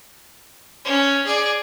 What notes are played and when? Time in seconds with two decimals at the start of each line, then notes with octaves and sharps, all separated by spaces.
0.85 C#4
1.25 G#4 D5